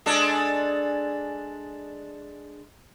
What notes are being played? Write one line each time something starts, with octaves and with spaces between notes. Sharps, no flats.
G#3 D4 A4